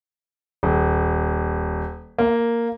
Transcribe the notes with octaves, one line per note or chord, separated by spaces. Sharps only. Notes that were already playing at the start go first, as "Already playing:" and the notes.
D#1
A#3